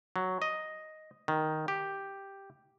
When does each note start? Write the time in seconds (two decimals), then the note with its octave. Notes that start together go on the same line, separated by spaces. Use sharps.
0.16 F#3
0.42 D#5
1.28 D#3
1.68 G4